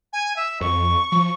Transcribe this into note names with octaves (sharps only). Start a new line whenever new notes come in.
G#5
E5
F2 C#6
F3